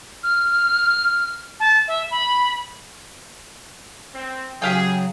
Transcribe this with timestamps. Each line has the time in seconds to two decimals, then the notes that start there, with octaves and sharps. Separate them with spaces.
0.23 F6
1.60 A5
1.88 E5
2.11 B5
4.13 C4
4.62 C#3 F#3 G4 G#4 F5 G5